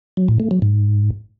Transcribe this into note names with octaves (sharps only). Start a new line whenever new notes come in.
F#3
A2
A3
F#3
G#2